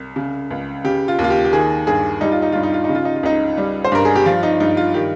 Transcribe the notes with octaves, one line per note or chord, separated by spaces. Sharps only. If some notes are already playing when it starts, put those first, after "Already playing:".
Already playing: C2
C#3
C#2
C#3 G4
F4
D#2
F4
G4
G4
D#3 G#4
G2 G#4
G3 D#4
F4
D#4
G2 F4
D#4
F4
D#4
C#3
F4
D#4
F4
C#2 D#4
G3
C5
G2 A#4
G#4
G4
F3 F4
D#4
G2 D#4
F4
D#3 G4